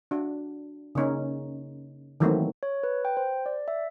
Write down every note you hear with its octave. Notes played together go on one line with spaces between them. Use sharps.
D4 F#4
C#3 A#3 C#4 D#4
D#3 E3 F#3 A3 A#3 C4
C#5
B4
G5
C5
D5
E5